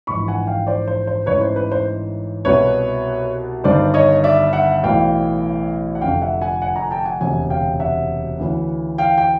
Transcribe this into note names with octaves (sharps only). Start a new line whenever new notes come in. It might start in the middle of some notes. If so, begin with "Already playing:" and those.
A#1 G#2 E3 B5 C#6
F#5 G#5
F5 G5
C5 D5
C5
C5
A1 G#2 E3 B4 C#5
C5
B4
C5
C2 B2 B4 C#5
G1 G2 D#3 C5 D5
C#5 D#5
D5 E5
E5 F#5
B1 A2 E3 F5 G5
F#5
F1 F2 D3 F5 G5
E5 F#5
F#5 G#5
F#5 G#5
G#5 A#5
G5 A5
F#5 G#5
E1 D2 C3 F#5 G#5
F5 G5
E5 F#5
D2 C#3 E3
F5 G5
G5